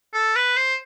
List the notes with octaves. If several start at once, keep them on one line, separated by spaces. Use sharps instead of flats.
A4
B4
C5